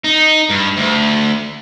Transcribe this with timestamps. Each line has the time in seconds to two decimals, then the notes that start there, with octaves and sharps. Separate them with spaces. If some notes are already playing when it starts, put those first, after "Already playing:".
0.04 D#4
0.51 G2
0.77 D2